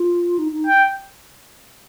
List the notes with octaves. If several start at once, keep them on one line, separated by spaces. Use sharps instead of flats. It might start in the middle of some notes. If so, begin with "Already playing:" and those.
Already playing: F4
D#4
D#4
G5